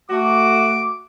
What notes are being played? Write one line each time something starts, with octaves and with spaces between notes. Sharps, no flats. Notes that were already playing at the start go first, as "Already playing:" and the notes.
A3 F#4 D6